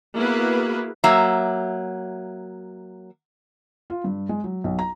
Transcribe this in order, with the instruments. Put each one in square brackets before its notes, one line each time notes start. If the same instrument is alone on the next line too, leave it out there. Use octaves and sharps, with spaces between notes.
[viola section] A#3 B3 E4 F#4 G#4 B4
[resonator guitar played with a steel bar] F#3 A#3 E5
[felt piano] F4
G2
G#3
F#3
B1
A#5